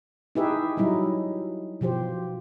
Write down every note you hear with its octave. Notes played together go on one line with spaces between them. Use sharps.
D#4 E4 G4 G#4 B4 E5
F#3 G3 D#4 E4
B2 F3 G4 C5